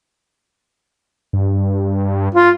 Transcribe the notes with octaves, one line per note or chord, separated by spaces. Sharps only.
G2
F4